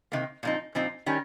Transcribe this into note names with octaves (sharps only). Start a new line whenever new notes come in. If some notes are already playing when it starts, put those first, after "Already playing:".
C3 D#3 A#3
A#2 F3 C4 D#4
A#2 F3 C4 D#4
D#3 G3 C#4